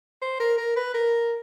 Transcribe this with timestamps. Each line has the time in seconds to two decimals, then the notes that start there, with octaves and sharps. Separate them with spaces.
0.22 C5
0.40 A#4
0.58 A#4
0.76 B4
0.94 A#4